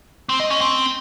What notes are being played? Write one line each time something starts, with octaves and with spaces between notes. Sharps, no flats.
C4
D#5
C#4
C4